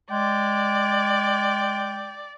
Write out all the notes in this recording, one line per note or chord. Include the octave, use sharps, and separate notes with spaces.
G#3 D5 G5